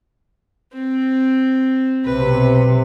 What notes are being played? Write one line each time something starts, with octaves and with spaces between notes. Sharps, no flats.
C4
B1 C3 B4